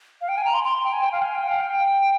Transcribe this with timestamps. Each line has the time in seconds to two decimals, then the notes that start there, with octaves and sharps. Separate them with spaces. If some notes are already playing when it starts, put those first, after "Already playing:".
0.21 F5
0.29 G5
0.38 G#5
0.45 A#5
0.54 C6
0.64 C6
0.84 G5
0.93 G#5
1.03 G5
1.12 F5
1.22 G#5
1.35 G5
1.48 F5
1.61 G5